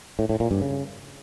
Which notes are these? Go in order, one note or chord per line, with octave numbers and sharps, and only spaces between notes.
A2
A2
A#2
G2
C#3